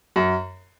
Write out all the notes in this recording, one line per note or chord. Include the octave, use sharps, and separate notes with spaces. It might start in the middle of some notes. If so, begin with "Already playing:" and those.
F#2